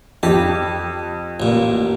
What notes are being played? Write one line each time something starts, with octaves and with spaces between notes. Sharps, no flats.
F2 G4
A1 A#2